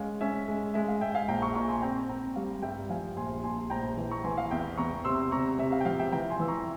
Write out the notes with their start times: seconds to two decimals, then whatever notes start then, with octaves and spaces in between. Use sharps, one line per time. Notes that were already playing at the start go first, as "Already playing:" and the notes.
Already playing: G#3 C#4 F5
0.21 C#4 E5
0.48 G#3
0.74 G#3 E5
0.88 F5
1.01 G#3 E5 G5
1.15 F5 G#5
1.28 A#1 G5 A#5
1.42 A#5 C#6
1.55 A#2 A#5 C#6
1.68 G#5 C6
1.82 C4 G5 A#5
2.09 C4 G5 A#5
2.36 G3 F5
2.62 G2 E5 G5
2.90 F3 F5 G#5
3.16 A#1 G#5 C6
3.43 A#1 G#5 C6
3.70 A#1 G5 A#5
3.97 E3
4.11 A#5 C#6
4.24 E3 G#5 C6
4.37 F5
4.51 E2 E5 G5
4.78 E2 A#5 C#6
5.05 C3 C6 E6
5.32 C3 A#5 C#6
5.58 C3 E5
5.72 F5
5.81 G5
5.85 F3 F5
5.99 E5 G5
6.12 E3 G5 A#5
6.30 G#5 C6
6.39 E3 E6
6.48 A#5 C#6